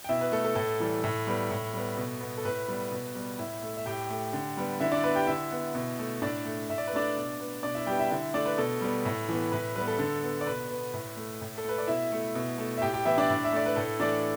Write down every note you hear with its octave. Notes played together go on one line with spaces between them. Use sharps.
G5
B2 E4 E5
B4
A3 A4
A4
A2 A4
E3 G3
A2
G3 B3
A2
G3 B3
B2
B3
A4
A2 B4
G3 B3
B2
G3 B3
A2 E4 E5
A3
E5
A2 G4 G5
A3
D3
G3 B3
D3 E4 E5
D4 D5
B3 B4
G4 G5
D3 E4 E5
B3
B2
A3
A2 D4 D5
A3
A2 E5
D5
B4
A3 D4 D5
B2
B3
B2 D4 D5
E4 E5
G3 B3 G4 G5
E4 E5
D3 E4 E5
A3 D4 D5
B4
B2 A4
G3 B3
A2
E3 B3
A2 B4
G3 B3 B4
A4
D3
B3
D5
B2 B4
B3
A2
A3
A2
A4
A3 B4
D5
B2 E4 E5
A3
B2
A3
E5
A2 G4 G5
G4 G5
E3 B3 E4 E5
D4 D5
A2
E5
A3 D5
B4
A2 A4
E3 A3 D4 D5